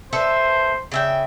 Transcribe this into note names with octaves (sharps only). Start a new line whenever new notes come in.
A4 B4 C5 E5
C#3 E5 G5